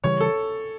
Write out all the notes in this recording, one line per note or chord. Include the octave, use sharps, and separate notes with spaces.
C#3 E3 G3 C#5
A4